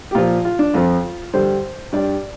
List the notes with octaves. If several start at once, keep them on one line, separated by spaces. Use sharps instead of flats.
G4
A#2 F3 F4
F4
D4
F2 F3 F4
G2 D3 G3 C5
G2 G3 D5